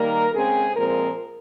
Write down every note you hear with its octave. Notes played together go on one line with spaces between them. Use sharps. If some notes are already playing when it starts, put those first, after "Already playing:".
Already playing: D#3 G3 A#3 A#4
C#3 G#3 C4 G#4
A#2 F3 G#3 C4 A#4